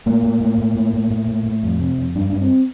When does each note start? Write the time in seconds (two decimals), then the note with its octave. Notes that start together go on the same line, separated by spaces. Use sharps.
0.06 A2 A#3
0.23 A2
0.41 A2
0.58 A2
0.75 A2
0.94 A2
1.11 A2
1.28 A2
1.46 A2
1.63 F2
1.81 C3
1.98 F2
2.15 G2 D4
2.30 G2 D4
2.41 C4